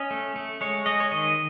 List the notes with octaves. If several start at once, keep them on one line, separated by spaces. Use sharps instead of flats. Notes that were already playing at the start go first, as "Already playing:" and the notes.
Already playing: C#4 D#5
A3
A3
G#3 C#5
G#3 D#5
C#5
D#3 D#5